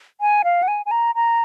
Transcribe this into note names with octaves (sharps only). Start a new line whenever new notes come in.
G#5
F5
F#5
G#5
G#5
A#5
A#5